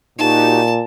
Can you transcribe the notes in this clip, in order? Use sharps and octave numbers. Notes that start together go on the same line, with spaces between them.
A#2 D#4 F#4 G4 A5